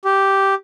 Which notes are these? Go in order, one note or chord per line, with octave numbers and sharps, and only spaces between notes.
G4